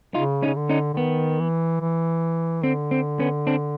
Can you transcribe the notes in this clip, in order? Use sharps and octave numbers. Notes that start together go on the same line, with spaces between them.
C#3 D#4 F4
C#4 D#4
C#3
D3
C#4 D#4
D3
D#3 B3
E3
E3
D3 C4
C4
B3 C#4
C4 D4